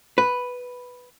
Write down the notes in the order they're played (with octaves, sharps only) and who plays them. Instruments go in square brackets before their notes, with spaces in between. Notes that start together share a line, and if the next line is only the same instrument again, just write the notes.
[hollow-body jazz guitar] B4